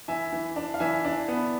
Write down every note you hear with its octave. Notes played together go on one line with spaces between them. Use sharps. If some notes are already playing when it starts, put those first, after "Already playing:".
E3 E5 G#5
E3
D4
F5
E3 E5 G#5
D4
B3